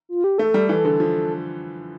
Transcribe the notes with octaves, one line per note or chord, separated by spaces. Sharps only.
F4
G4
A3 A4
G3
E3 A4
D3
F3